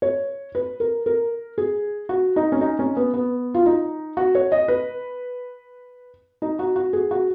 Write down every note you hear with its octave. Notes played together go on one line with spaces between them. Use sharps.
C#5
B4
A#4
A#4
G#4
F#4
D#4
C#4
D#4
C#4
B3
B3
F4
D#4
F#4
C#5
D#5
B4
D#4
F#4
F#4
G#4
F#4